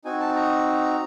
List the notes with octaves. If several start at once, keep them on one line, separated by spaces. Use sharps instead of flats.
C4 D#4 F#4 G#5
A5
A#5